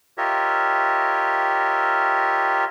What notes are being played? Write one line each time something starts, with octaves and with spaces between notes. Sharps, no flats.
F4 G4 A#4 C#5 D#5 E5